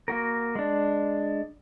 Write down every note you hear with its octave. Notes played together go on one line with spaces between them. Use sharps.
A#3 F#4 A#4
G#3 D4